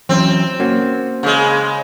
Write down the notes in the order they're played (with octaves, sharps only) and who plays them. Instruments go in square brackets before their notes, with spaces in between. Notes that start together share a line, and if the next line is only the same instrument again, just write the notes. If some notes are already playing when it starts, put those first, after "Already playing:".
[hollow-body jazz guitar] E3 F#3 C#4 [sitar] C4
[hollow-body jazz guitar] A#3 C#4 F#4
[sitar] C#3 G#3